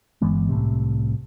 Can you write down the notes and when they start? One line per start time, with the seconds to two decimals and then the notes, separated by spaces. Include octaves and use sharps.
0.22 G1 E3 G#3 B3
0.49 C2 A2 C3